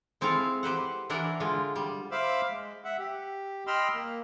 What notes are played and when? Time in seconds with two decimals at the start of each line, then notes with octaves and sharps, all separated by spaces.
0.21 G#3 C4 E4 A4 F5
0.63 G4 B4 C5 F#5
1.10 E3 D4 E4 A#4 F#5
1.40 D3 G#3 F4
1.76 G3
2.12 C5 E5 F5 B5 D6 E6
2.48 G#3
2.85 E5 F#5
2.99 G4
3.67 D#5 G5 B5 C6 E6 F6
3.93 A#3